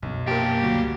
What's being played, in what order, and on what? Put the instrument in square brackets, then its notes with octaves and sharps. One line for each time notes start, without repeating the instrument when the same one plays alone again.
[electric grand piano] B1 [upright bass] F#2 B2
[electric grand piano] A#1 A#4 [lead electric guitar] A#3 A5 [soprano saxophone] G4
[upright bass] G1 C#2 [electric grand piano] F#3 G3